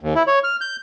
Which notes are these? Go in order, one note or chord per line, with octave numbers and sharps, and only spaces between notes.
D#2
E4
C#5
F6
G6